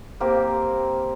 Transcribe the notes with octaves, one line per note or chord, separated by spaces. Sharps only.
A#3 C4 G4 A#4